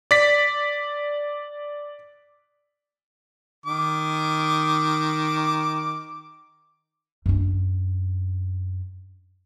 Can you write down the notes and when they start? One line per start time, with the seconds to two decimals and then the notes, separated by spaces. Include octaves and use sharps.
0.11 D5 B6
3.66 D#3 D6
7.26 F#2 D4